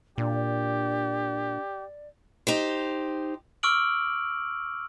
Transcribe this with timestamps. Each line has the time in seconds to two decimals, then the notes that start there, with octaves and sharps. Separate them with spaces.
0.18 A#2 D4 G4 D5
2.47 D#4 G4 C5
3.63 C#6 D6 E6 F6 D7 F#7